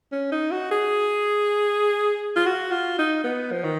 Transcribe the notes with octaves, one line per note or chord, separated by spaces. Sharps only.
C#4
D#4
F#4
G#4
F4
F#4
F4
D#4
B3
F3
D#3